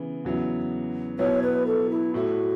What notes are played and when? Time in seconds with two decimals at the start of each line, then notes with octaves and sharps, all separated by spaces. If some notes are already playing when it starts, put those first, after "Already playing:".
Already playing: C#3 E3 B3
0.24 E2 C#3 F#3 B3 E4
1.19 B2 F#3 B3 E4 C#5
1.42 B4
1.66 A4
1.90 E4
2.14 A2 A3 E4 F#4